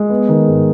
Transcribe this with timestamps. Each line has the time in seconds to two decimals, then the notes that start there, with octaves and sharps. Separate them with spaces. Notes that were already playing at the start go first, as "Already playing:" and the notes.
Already playing: G#3
0.10 B3
0.29 D#3
0.48 G#2